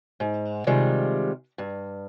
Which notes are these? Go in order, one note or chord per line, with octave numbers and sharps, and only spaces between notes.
G#2
C3 D#3 G3 G#3 F4
G2